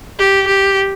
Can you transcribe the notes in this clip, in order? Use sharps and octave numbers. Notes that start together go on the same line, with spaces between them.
G4
G4